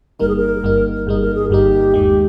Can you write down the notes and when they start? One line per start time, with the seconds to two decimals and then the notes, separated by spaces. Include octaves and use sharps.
0.20 G1 G2 G3 A#3 D#4 A#4
0.29 G#4
0.36 A#4
0.63 G1 G2 G3 A#3 D#4
1.06 G1 G2 G3 A#3 D#4 G#4
1.22 A#4
1.35 G#4
1.50 G1 G2 G3 A#3 D#4 G4
1.94 D#2 D#3 G#3